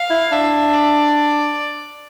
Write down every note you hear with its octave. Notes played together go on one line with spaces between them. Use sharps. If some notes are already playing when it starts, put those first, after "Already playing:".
Already playing: F5
E4
D4 E5
D5